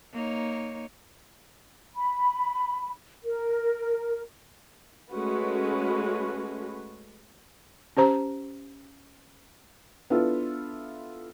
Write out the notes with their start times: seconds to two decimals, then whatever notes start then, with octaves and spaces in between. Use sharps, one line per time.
0.13 A#3 D#4 C#5
1.96 B5
3.25 A#4
5.10 G#3 A3 C#4 F#4 B4
7.97 C#4 G4 C5 A#5
10.10 B3 D4 E4 F4 A4 B4